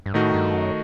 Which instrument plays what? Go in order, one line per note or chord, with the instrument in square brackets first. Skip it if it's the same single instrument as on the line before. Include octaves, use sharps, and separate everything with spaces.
[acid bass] G2
[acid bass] A2 [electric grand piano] D#3 A3 D#4 F#4
[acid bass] G2
F#2